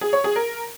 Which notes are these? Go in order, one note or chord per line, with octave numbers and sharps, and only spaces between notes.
G#4
C#5
G#4
A#4